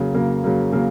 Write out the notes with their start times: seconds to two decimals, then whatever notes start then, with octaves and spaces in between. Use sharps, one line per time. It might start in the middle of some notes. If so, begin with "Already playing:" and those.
Already playing: C#3 F#3 A#3
0.14 C#3 F#3 A#3
0.44 C#3 F#3 A#3
0.72 C#3 F#3 A#3